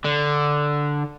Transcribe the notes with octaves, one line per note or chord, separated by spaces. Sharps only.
D3